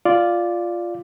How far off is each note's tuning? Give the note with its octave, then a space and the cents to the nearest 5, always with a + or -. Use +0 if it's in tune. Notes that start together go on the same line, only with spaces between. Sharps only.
F4 +0 D5 +0